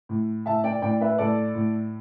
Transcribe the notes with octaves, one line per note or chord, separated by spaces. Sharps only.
A2
A2 E5 A5
D5 G5
A2 D5 G5
B4 E5
A2 A4 D5
A2